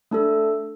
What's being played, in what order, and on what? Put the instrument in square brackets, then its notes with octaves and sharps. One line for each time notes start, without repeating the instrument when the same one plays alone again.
[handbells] A3 D4 A4